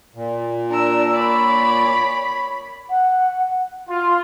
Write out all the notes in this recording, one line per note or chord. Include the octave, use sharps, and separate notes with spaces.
A#2
D4 A#4 E6
C#5 D5 B5
F#5
F4